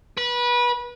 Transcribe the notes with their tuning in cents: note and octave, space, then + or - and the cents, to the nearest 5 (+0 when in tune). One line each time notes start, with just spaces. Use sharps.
B4 -25